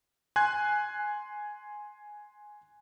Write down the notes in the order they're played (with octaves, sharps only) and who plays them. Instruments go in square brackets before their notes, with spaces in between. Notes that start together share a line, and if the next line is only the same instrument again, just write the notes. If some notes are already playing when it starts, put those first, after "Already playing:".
[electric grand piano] G#5 C6 F#6 G#6